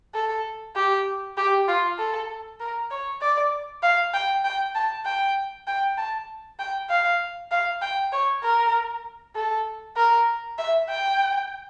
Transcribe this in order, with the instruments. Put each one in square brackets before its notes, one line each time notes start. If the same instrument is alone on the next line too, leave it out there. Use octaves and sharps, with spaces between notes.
[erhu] A4
G4
G4
F4
A4
A#4
C#5
D5
F5
G5
G5
A5
G5
G5
A5
G5
F5
F5
G5
C#5
A#4
A4
A#4
E5
G5